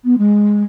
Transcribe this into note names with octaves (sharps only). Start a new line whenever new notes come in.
B3
G#3